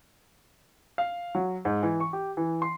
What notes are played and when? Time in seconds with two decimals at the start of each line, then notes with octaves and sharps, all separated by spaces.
0.98 F5
1.35 F#3
1.65 G#2
1.83 E3
2.00 C#6
2.13 G4
2.37 E3
2.62 C6